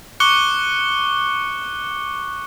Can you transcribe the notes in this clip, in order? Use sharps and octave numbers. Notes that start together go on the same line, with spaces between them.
C#6 D6 F#6 C#7 G7